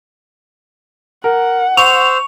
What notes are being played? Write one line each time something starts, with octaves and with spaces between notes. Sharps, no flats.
A#4 F#5
C5 C#6 E6 F7